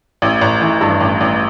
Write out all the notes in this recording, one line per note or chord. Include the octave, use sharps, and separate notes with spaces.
A1
A1
E3
G2
A1
A1